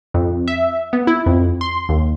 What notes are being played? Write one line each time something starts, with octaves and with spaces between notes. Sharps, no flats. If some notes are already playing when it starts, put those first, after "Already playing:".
F2
E5
B3
E4
F2
C6
D#2